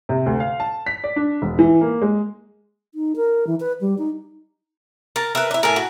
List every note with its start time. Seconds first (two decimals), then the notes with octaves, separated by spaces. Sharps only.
0.09 C3
0.26 D2
0.40 F5
0.60 A5
0.87 B6
1.04 D5
1.16 D4
1.42 E1
1.59 E3
1.81 A#3
2.02 G#3
2.95 D#4
3.16 A#4
3.47 E3
3.60 B4
3.81 G3
3.98 D#4
5.16 A#4 A5
5.35 A#4 B4 E5
5.51 D4 E4
5.63 A2 A#4 G#5 A5
5.76 F#4